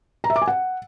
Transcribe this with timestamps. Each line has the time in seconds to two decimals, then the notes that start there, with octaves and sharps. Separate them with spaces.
0.24 A#5
0.30 E5
0.36 D6
0.42 G#5
0.48 F#5